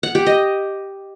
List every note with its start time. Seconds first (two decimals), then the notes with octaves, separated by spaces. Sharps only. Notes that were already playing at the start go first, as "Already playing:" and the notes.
0.03 F#5
0.15 G4
0.26 D#5